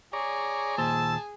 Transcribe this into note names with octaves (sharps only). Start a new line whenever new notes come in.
G#4 C#5 D5 A#5
D#2 A#2 C5 A5 E6